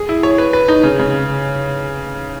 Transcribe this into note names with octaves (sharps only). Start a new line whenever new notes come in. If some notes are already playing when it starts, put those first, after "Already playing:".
Already playing: G#4
E4
C#5
B4
B4
D#4
C#3
C#3